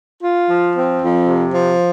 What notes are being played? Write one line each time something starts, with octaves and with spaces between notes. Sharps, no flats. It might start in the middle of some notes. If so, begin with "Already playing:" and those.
F4
F3
C4
F2
C3
F3